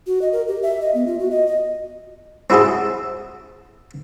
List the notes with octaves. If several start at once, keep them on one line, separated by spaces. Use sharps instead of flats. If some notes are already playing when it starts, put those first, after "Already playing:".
F#4
D#5
A#4
G4
E5
D#5
B3
F4
F#4
D#5
D#5
C4 E4 F#4 G#4 A4